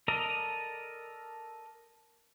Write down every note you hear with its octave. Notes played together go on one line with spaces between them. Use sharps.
A4 A#4 D5 D#5 A#5